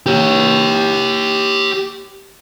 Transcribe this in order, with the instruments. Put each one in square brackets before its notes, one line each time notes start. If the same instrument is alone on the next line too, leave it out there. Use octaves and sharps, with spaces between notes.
[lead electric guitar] G4 C#5